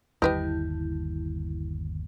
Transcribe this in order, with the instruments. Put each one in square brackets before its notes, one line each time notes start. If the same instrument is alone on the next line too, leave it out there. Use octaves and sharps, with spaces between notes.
[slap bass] G1 D#2 G3 [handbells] E4 G6 [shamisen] G4 B4 D#5